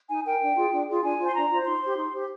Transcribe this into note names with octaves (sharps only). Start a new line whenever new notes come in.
D#4 G#5
A#4 G5
D4
F4 G#4
D4
F4 G#4
D4 G#5
F4 C5
C6
D4 A#5
F4 C5
D#4 C6
G4 C5
D#4
G4 C5